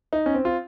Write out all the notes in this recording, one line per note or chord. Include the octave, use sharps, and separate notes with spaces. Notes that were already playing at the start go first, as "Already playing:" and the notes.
D#4
C#4
C4
F4